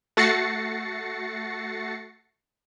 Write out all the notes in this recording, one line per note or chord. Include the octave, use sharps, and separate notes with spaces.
A3 F#4 A6 A#6 C7 C#7